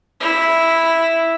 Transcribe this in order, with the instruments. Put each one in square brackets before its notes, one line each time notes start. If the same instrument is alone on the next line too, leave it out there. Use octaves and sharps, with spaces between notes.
[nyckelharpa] E4